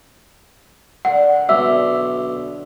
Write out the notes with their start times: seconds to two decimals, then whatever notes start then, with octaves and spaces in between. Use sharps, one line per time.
1.05 D3 D4 A#4 F#5
1.49 B1 E5